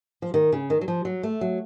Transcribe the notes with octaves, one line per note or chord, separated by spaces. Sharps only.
F3
D#3
C#3
D#3
F#3
F3
F#3
A3
F#3